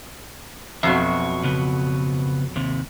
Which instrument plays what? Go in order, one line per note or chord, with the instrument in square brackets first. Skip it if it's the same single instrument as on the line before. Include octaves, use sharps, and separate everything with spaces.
[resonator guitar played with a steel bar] F2 B2 F#3 [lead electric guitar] E5
[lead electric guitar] C#3 B3
D#2 C3